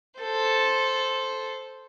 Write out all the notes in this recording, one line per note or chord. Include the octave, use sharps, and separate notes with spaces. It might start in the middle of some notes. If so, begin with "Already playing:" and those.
A4 C5